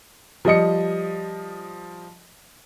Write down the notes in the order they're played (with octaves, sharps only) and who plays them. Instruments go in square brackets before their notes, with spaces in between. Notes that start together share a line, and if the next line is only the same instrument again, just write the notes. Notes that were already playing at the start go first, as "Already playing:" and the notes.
[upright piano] F3 G3 D#5 C#7